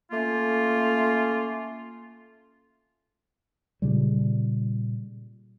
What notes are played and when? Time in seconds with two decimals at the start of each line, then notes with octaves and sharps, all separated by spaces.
0.11 A3 A#3 C#4 F4
3.82 A#2 C#3 G3